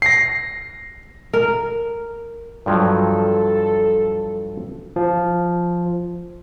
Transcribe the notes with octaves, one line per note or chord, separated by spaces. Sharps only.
A#6 C7
A#4
G2 F3 F#3 A4
F3